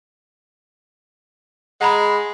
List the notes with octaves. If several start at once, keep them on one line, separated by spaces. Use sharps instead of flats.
G#3 F#5 A#5 B5